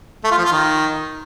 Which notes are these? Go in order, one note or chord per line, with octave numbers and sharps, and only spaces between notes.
A3
F4
F3
F4
D#3